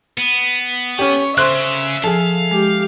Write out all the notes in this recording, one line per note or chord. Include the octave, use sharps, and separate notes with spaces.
B3
C#4 G4 C#5
C#3 C5 E5 C6 F#6
F3 G#4 A4 F5
G#3 G4